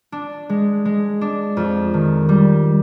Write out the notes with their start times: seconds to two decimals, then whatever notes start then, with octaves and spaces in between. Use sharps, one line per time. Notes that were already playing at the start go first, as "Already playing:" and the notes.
0.12 D4
0.49 G#3
0.85 G#3
1.21 D4
1.57 F2
1.94 D#3
2.29 G3